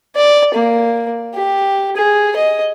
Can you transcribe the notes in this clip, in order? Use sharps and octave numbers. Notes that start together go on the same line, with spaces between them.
D5
A#3
G4
G#4
D#5